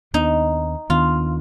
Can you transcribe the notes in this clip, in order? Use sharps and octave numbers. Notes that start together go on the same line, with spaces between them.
D#2 D#3 B3 D4 D#4
D#2 D#3 B3 D4 F4